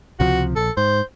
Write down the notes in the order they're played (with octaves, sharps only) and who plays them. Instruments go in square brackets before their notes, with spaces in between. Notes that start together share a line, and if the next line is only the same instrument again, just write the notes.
[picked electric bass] C#2 C3 F3 [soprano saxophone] F#4
[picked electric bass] A#1 [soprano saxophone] A4
[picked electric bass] G#2 [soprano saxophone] C5